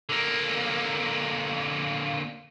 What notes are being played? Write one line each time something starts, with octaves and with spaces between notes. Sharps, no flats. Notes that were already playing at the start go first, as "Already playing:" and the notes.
D3 A#3